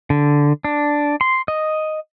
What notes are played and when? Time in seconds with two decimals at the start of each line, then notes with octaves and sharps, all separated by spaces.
0.10 D3
0.65 D4
1.21 C6
1.48 D#5